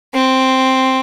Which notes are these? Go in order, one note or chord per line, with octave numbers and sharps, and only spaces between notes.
C4